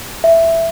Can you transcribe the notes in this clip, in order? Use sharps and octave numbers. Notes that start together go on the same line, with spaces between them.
E5